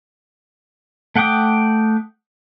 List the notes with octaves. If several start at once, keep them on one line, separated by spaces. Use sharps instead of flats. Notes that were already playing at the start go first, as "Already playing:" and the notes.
A3 F#5 G5 D6 D#6